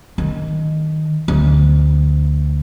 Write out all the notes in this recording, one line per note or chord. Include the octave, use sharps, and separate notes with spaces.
D#3
D2